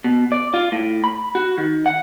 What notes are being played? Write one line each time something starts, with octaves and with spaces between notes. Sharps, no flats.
B2
D5
F4
A2
B5
F#4
D#3
F#5